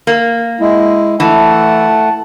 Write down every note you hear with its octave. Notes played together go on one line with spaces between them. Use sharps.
A#3
G#3 E4
E3 A3 F#5 A5